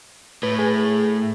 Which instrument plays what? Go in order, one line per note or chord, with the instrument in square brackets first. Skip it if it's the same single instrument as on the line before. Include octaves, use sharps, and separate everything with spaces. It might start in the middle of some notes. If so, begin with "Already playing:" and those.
[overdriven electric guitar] A2 [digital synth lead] B4
[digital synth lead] G#4